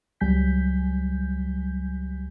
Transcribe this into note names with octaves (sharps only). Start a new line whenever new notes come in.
C#2 F#3 G3 G#5 G6 B6